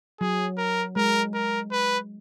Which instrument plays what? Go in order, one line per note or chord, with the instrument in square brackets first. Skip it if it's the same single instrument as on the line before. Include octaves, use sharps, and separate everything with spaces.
[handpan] F#3 [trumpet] G#4
[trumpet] A#4
[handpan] G#3 [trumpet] A#4
[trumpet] A#4
B4